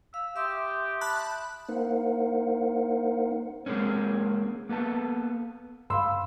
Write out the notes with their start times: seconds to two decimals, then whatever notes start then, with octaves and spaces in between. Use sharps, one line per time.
0.14 F5 E6
0.36 G4 E5 C6 D#6
1.01 A5 B5 F#6
1.69 A#3 D#4 A#4 C5 F5 F#5
3.66 G#3 A#3 C4 C#4
4.69 A#3 B3 A4 A5
5.90 G2 F5 B5 C6 E6